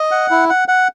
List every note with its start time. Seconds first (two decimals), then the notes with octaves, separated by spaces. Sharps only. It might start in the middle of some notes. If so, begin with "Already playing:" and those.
Already playing: D#5
0.11 F#5
0.31 E4
0.50 F#5
0.68 F#5